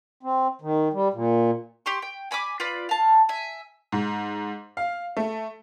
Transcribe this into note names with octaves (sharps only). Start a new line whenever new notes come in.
C4
D#3
G3
A#2
G4 C6 C#6
G5
G#5 B5 C#6 D6
F4 B4 D5 B5
F5 A5
E5 G#5
G#2
F5
A3